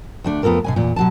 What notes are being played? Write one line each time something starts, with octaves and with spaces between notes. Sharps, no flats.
D2 A3 D4
F2 B3 F4 A4 A#4
B2 F#3 G#5
E2 A#2
B2 F#3 A5